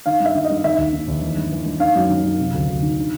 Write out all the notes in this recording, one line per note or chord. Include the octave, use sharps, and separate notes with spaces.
D#3 F5
G2
E5
D#3
D#5
G2
D#3 E5
D#2
D#3
D#2
E3
G2
E3
G2
D#3 F5
F#2
D#3
F#2
C3
D2
D2
D#3
D3